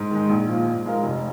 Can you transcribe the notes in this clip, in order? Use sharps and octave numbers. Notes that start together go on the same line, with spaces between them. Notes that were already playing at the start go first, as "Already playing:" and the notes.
Already playing: G#2
D#3 G#3
A#1
A#2 F3
G#2
G#3 F4 A#4
F1